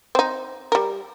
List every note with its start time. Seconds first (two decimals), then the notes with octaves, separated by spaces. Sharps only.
0.15 C4 D#4
0.72 G3 A#4